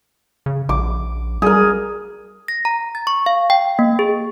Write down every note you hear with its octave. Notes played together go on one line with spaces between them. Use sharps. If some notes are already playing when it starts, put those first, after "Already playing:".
C#3
A#1 D6
G3 G#4 A#4
A#6
A#5
A6
C#6
F5
G5
A#3
G#4